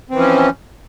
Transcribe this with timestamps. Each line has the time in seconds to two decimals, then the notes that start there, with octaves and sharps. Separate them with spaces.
0.10 C4
0.13 E3
0.15 F3
0.18 C#4